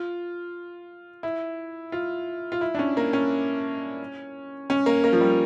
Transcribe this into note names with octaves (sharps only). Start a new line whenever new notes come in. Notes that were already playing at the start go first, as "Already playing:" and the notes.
Already playing: F4
E4
F4
F4
E4
D4
C#4
A#3
C#4
C#4
A#3
A#3
F3
G3